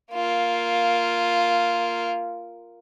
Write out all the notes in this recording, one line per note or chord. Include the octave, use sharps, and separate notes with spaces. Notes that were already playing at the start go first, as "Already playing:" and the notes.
A#3 F4